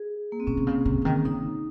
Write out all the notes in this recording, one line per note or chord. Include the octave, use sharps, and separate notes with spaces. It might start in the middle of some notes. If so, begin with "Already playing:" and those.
Already playing: G#4
A#3
C4
A#2 C#4
C3
C#3
C3
C#3
D#3
C#3 D#4